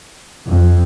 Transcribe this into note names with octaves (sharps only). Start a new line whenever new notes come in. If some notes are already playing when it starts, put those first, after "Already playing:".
F2